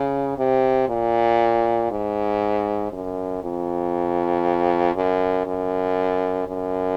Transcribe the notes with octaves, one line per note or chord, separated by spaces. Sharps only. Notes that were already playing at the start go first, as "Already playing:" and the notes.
Already playing: C#3
C3
A#2
G#2
F#2
F2
F#2
F#2
F#2